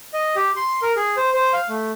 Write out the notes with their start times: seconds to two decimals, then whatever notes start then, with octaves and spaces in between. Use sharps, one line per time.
0.13 D#5
0.36 G4
0.56 C6
0.82 A#4
0.96 G#4
1.17 C5
1.33 C5
1.53 F5
1.69 A3